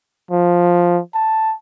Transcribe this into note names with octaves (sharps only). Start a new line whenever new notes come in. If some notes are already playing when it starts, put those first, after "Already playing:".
F3
A5